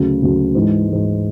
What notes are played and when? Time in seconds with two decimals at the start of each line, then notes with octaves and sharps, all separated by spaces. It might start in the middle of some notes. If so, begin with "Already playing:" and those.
Already playing: D2 C#3 F#3
0.22 D2 C#3 F#3
0.55 G#2 E3 G#3
0.88 G#2 E3 G#3